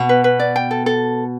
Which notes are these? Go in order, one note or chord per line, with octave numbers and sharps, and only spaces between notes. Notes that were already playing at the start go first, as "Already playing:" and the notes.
Already playing: B2
B4
B4
D5
G5
A4
A4